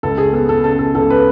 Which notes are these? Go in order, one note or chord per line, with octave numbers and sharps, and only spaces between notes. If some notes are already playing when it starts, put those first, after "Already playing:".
C#2 A4
G#4
B3 A4
A4
C#3 A4
A4
C#2 A4
B4